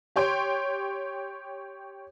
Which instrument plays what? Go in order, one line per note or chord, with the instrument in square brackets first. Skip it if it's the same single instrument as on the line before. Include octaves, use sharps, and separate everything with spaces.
[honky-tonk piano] G4 C#5 G5 C6